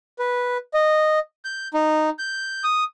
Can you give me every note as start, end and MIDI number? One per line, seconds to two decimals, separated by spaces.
0.19 0.57 71
0.74 1.19 75
1.45 1.68 91
1.74 2.10 63
2.19 2.64 91
2.64 2.84 87